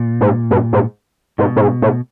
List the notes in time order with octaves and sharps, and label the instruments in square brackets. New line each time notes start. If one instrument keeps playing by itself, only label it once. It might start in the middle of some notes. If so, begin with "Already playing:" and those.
Already playing: [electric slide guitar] A#2
[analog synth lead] G#2
G2
G#2
[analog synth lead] G#2 [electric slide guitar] B2
[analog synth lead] A2
G#2
A2